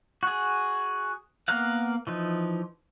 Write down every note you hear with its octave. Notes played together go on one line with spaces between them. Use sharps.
F#4 G#4
A#3 B3 A#4 F5 F#5
E3 F3 D#4